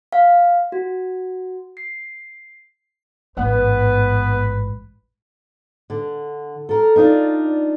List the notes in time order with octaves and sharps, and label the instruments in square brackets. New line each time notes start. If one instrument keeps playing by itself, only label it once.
[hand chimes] F5
F#4
C7
[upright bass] A1 G#2 [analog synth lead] B3 [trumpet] B4
[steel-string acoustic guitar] D3
A4 A#4
D4 D#4 F4 D5